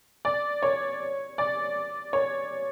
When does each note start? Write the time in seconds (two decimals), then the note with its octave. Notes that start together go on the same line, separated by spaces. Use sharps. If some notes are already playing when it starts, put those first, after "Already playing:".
0.25 D5
0.63 C#5
1.38 D5
2.13 C#5